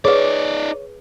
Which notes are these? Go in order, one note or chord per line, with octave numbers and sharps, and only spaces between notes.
D#4 G#4 B4 C#5 D5